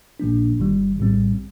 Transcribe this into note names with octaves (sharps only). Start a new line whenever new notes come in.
A#1 A#2 F3 A#3 D4
G1 G2 D#3 G3
A#1 A2 G3 C4